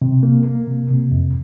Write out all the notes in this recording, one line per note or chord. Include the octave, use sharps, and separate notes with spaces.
C3
A#3
A#3
C3
C3
F2